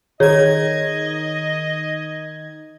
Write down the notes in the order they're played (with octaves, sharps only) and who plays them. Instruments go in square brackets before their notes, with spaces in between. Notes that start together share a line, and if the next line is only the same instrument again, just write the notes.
[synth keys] D#3 G#6 [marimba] G#4 [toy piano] C#5 [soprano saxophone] D#5